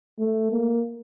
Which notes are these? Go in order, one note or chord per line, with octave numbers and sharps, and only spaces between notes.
A3
A#3